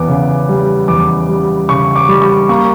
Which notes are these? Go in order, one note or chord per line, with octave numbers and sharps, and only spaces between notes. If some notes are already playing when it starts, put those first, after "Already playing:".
Already playing: E2 B3 D6
C#3
G3
E2 D6
G3
C#3 C#6
D6
G3
C#6
A#3 C#6